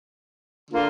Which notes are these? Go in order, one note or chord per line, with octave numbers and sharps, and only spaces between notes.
D3 A#3 F4